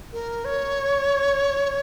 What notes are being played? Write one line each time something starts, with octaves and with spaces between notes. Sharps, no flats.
A#4
C#5